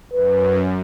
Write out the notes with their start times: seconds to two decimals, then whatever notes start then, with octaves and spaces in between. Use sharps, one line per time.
0.13 F#2 B4